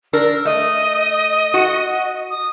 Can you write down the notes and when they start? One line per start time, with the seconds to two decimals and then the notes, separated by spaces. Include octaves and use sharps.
0.13 D4 A#4 E6
0.45 A3 D#5
1.54 F#4 F#5
2.30 D#6